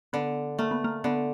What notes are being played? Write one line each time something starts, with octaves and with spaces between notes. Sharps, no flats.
D3 B3
A3 A#3
B3
A#3
D3 B3